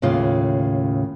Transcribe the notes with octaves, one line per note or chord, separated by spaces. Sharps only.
D#2 A2 C#3 F4